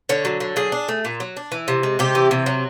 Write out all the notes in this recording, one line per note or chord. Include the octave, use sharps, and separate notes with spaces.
D3 C#5
F#3
D3
F#3 G#4
D4
A3
A#2
F#3
D4
E3
C3
G#3
C3 G4
E3
C3
F#3